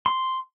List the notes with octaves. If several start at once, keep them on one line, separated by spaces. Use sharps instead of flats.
C6